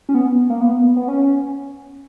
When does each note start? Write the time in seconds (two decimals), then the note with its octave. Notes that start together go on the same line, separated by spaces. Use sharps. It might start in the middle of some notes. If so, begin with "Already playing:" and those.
0.09 C#4
0.15 B3
0.50 A#3
0.61 B3
0.96 B3
1.08 C#4